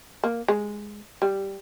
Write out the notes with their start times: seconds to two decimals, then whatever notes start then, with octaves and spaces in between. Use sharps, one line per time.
0.24 A#3
0.48 G#3
1.22 G3